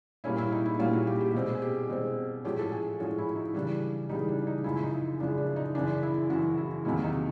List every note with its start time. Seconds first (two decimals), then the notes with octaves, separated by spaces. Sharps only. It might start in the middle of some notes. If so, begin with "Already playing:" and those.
0.24 A#2 G3 A#3 C#4 E4
0.38 E4
0.52 D#4
0.65 E4
0.79 A#2 G3 A#3 C#4 F4
0.93 F#4
1.07 G4
1.21 G4
1.34 B2 G#3 C4
1.55 G#4
1.62 G4
1.90 B2 G#3 C4
2.44 A2 F3 G#3 C#4 G4
2.59 A4
2.72 G#4
3.00 A2 F3 G#3 C#4 F#4
3.18 E4
3.36 D#4
3.54 C#3 E3 G3 D4
4.09 G3 D#4
4.12 C#3 E3
4.29 D4
4.47 D#4
4.64 F#2 C#3 F3 G#3 E4
4.75 E4
4.83 D#4
5.20 F#2 C#3 F3 G#3 D4
5.38 D4
5.56 D#4
5.75 F#2 C#3 E3 D4
6.03 E4
6.29 F#2 C#3 E3 F#4
6.58 E4
6.85 E2 C3 D#3 F#3 A#3 E4
7.04 D#4